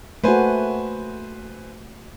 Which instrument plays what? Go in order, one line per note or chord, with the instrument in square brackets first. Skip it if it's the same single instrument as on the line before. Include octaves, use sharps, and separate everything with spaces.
[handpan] A3 A#3 F#4 [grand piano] B4 C5 G#5